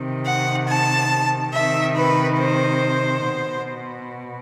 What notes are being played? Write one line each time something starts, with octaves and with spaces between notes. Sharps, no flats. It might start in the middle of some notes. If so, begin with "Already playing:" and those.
Already playing: C3 D#3
F#5
A5
C3 D#3 E5
B4
C5
B2